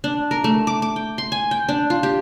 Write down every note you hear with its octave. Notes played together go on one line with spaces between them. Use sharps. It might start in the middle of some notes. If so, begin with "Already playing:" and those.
D4
A#4
A3
D6
D6
G5
C6
G#5
G5
D4
F4
G4